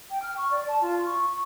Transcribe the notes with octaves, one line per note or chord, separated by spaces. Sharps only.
G5
F6
C#6
D5
A5
F4
C#6
C#6